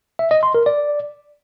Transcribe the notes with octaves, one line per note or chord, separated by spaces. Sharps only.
E5
D#5
C6
A#4
D5